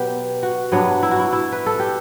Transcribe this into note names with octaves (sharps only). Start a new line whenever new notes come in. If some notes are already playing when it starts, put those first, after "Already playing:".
Already playing: B2 F#3 B3 G4 B4
F#4
G2 F#3 B3 D4
E4
F#4
E4
E4
B4
A4
G4